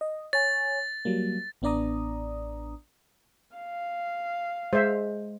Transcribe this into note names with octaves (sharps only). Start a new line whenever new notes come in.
D#5
C#5 G#5 A6
F#3 G3 A#3
A1 B3 D4 D5 A#5 D#6
F5
G#3 C5 E5